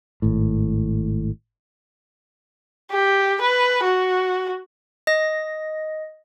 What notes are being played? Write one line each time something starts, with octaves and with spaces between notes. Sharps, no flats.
G#1 A2
G4
B4
F#4
D#5 A#6